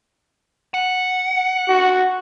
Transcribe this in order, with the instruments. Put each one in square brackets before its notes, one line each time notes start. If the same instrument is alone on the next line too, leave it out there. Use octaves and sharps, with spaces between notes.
[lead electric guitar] F#5
[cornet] F#4